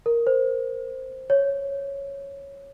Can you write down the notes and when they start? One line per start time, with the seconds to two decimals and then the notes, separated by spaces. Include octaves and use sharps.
0.06 A#4
0.27 C5
1.30 C#5